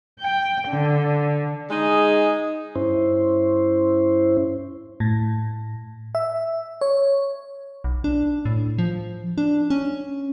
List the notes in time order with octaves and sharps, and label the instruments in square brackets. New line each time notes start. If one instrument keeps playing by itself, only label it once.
[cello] G5
D3
[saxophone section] G#3 D#4 G#4
[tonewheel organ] G2 C#4 E4 C5
[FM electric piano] A2
E5
C#5
[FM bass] B1
D4
A2
F3
D4
C#4